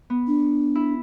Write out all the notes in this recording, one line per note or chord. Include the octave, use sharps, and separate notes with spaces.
B3
D4
E4